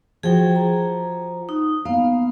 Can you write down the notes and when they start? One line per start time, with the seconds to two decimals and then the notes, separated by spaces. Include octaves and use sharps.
0.23 F3 F#4 G#4 G5
0.55 A#5
1.49 D#4
1.85 A#3 B3 F5